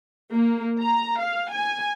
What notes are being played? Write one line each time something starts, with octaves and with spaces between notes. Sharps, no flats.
A#3
A#5
F5
G#5